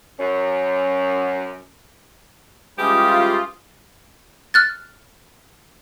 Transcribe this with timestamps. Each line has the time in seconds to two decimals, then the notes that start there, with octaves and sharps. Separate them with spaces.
0.20 F#2 C#4
2.79 E3 G3 G#3 C#4 F4 G4 D#6
4.54 F6 F#6 A6